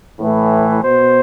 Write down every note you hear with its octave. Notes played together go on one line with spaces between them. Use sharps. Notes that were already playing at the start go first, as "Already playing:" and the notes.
A2 E3
B2 C5